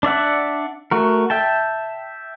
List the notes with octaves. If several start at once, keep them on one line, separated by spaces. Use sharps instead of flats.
D4 D5 E5 F#5
A3 F#4 A#4
E5 G5 A5